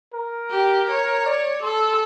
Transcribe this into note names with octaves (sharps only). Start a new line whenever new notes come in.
A#4
G4
C#5
D5
A4 C6